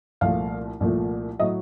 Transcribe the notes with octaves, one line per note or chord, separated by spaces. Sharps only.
C2 A#2 F3 A3 F5
C2 A#2 F3 A3
A2 F#3 A3 D#5